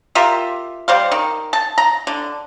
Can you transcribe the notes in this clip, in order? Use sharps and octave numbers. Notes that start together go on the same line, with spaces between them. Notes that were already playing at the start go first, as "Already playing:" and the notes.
F4 G4 A#4 E5
G3 C5 F5
D#3
A5
A#5
D3